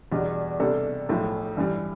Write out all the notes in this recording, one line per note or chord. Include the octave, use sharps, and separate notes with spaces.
E2 B2 G3 D4
C3 G3 B3 D4 A4
B1 A2 F3
G2 E3 G3